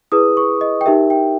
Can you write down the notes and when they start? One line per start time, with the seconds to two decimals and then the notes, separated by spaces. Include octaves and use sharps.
0.12 E4 G#4 B4 D#6
0.37 C#6
0.61 D#5
0.81 G5
0.86 D#4 G4 A#4 E5
1.10 G5